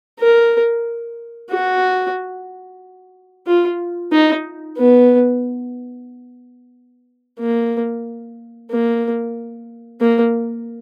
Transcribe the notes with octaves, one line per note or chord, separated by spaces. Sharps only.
A#4
F#4
F4
D#4
B3
A#3
A#3
A#3